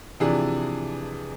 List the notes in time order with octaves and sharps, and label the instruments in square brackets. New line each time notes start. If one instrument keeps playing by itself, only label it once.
[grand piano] C3 E3 F3 D4 G#4